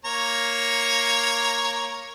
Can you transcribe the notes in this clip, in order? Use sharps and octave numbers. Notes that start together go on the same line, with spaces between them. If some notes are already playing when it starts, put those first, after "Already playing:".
A#3 C#5 A#5